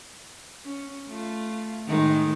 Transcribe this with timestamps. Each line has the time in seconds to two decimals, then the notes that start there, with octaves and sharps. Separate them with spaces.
0.65 C#4
1.08 A3 F4
1.86 A2 D#3 G#3